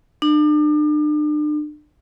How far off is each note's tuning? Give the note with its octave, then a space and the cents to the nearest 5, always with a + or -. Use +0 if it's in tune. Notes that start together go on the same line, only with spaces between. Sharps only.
D4 +40